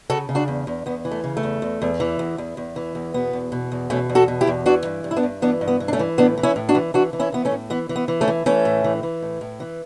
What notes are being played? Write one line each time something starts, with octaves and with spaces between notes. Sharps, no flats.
C#3 F#4 A4
C#3
D4 F#4
E2
E2
E2 B3
E3
A3
C#3
A3
E2
E2
E2
E3
E2
E2
E2
E3
E2
B2 B3
E2
B2
E2
B2 A3 C#4
E2
F#4 A4
B2
E4 G4
E2
E3 D4 F#4
G2
G2
E4
B3 D4
G2
E3 B3 D4
G2
B3
E3
D4
A3 C#4
E3
A2 B3 D4
E3
C#4 E4
A2
D4 F#4
E3
E3 D4 F#4
E3
C#4 E4
E3 B3
A3 C#4
A2
E3 B3
E3
B3
E3
A3 C#4
E3
E3 A3 C#4
A2
E3
E3
A2
A2
E3